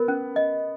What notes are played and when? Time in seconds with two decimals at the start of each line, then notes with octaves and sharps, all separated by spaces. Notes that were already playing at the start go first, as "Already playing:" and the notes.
Already playing: B3 A#4
0.08 C#4
0.36 D#5